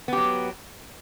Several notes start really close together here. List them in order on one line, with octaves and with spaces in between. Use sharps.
B3 G4 F#3